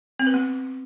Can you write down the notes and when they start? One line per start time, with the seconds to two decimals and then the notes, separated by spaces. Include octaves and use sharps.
0.19 C4
0.27 B4
0.34 B3